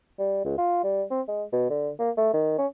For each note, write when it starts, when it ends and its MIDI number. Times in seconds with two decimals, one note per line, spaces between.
0.19 0.40 55
0.45 0.58 37
0.58 0.83 65
0.84 1.03 55
1.11 1.21 60
1.28 1.43 56
1.53 1.70 47
1.70 1.91 50
1.99 2.10 58
2.17 2.32 57
2.34 2.54 51
2.58 2.67 61